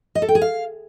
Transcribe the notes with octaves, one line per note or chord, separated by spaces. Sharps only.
D#5
A4
G5
G#4
F5